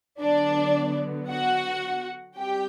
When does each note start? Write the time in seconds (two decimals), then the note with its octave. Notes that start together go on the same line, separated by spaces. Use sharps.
0.20 D3 F#3 B3 D4 D5
1.30 F#4 F#5
2.37 G3 C4 G4 G5